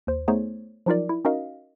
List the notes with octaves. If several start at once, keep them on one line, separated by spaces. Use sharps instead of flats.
D#2 C5
A3 B3 D#4 G#4 C5 C#5
F3 F#3 D#4 F4 A#4 D5
E4
C#4 D#4 F#4 A#4 D#5 F5